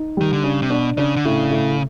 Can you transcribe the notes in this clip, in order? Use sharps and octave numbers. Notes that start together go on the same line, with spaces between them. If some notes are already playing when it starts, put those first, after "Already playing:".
Already playing: D#4
D#3 G3
D3
C#3 D4
C3
B2 D4
C#3 D4
D3
A2 C#3
A2